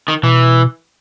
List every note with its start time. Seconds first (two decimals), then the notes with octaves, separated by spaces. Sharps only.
0.08 D#3
0.23 B2 E3